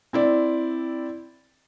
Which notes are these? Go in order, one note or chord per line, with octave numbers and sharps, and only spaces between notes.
C4 E4 D5